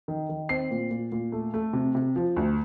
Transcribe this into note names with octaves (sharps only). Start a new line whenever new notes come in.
D#3
D#3
C4 C7
A#2
A#2
A#2
A3
A3
C3
C3
F3
D2